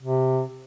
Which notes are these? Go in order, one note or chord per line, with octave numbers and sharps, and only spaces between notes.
C3